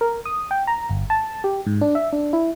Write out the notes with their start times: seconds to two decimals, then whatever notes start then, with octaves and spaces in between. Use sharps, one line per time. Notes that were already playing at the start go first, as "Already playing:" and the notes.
0.01 A#4
0.25 D#6
0.51 G5
0.67 A#5
0.89 G1
1.10 A5
1.44 G4
1.66 G#2
1.81 D4
1.95 E5
2.13 D4
2.33 E4